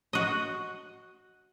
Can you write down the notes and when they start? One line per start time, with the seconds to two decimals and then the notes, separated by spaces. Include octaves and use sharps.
0.13 F#4 D#5